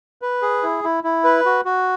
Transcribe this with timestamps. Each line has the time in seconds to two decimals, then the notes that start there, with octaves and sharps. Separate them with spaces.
0.22 B4
0.42 G#4
0.63 E4
0.84 E4
1.04 E4
1.24 B4
1.46 F#4
1.65 F#4